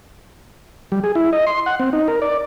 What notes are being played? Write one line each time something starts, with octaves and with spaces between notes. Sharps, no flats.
G3
G#4
E4
D#5
C6
F#5
C4
D#4
A#4
D5